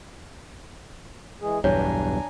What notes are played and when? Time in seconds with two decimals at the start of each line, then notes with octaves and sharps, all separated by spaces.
1.41 E3 G#3 G#4
1.64 B1 E2 G2 D4 C#5 G#5 A#5